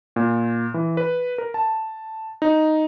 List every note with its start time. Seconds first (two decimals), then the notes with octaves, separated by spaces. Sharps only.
0.16 A#2
0.74 E3
0.97 B4
1.38 A#4
1.54 A5
2.42 D#4